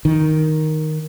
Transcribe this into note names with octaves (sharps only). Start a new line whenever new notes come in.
D#3